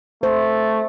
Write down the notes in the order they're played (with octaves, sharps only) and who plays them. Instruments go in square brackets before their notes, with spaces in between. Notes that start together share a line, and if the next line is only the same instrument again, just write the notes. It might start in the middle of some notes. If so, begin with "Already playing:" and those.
[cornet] A3 [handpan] C5